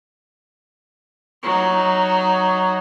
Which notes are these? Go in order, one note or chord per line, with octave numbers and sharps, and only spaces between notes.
F#3 D#4